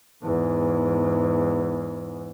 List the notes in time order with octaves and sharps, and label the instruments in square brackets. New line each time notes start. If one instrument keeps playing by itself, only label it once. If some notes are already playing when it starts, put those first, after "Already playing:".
[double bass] E2 G#2